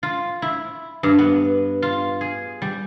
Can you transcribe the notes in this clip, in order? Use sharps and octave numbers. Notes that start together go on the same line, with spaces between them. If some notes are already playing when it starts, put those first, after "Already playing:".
F4
E4
G2
B3
F4
G#4
G3